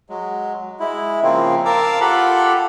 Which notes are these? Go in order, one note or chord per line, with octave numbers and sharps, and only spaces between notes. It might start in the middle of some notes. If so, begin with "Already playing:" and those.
F#3 G#3
G#3 E4
C#3 F3 A#3 C4
A#4 F5 A5 D6 E6
F4 G4 A4 F#5 B5